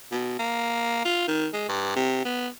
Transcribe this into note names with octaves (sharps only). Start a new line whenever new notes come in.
B2
A#3
F4
D#3
G#3
G2
C3
B3